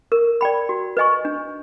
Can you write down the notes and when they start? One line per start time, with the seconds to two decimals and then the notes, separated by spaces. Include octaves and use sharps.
0.12 A#4
0.41 D5 G5 B5
0.69 F#4
0.97 B4 D#5 G#5 C#6
1.25 D4